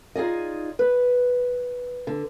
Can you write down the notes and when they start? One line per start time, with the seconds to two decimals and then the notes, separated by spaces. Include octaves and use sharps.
0.16 D#4 F4 G#4 D5 D#5
0.79 B4
2.07 D3